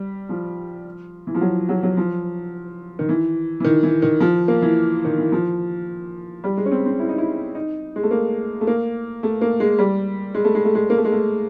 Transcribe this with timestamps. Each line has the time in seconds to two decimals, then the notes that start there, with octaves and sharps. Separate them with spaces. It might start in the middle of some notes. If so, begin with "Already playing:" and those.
Already playing: G3
0.29 F3
1.27 E3
1.35 F3
1.41 F#3
1.69 F#3
1.83 F#3
1.97 F3
2.99 D#3
3.09 E3
3.60 E3
3.65 D#3
3.83 E3
4.02 D#3
4.20 F3
4.48 A#3
4.62 E3
5.05 D#3
5.18 E3
5.32 F3
6.44 G3
6.57 G#3
6.66 C#4
6.72 C4
6.86 C4
7.00 E4
7.09 D#4
7.18 E4
7.55 D#4
7.96 G#3
8.03 A3
8.11 A#3
8.61 A3
8.67 A#3
9.23 A3
9.41 A#3
9.60 G#3
9.79 G3
10.34 G#3
10.44 A3
10.55 G#3
10.65 A3
10.75 G#3
10.90 A#3
10.98 A3
11.05 G#3
11.12 A3